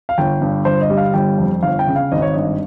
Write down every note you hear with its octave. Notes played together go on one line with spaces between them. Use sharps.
F5
G1 G5
G2
G1 C5
D#5
G3
F5
G1 G5
F2
G1 F5
G5
C#3
F5
G#1 D#5
C#5
G2 D#5